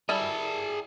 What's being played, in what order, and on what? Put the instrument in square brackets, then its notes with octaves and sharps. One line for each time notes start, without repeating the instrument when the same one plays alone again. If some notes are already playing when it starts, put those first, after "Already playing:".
[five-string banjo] G3 E4 A4 [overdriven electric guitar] G#4 A5